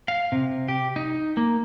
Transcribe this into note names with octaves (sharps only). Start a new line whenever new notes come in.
F5
C3
G4
D#4
A#3